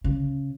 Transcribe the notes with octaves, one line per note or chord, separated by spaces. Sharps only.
C#3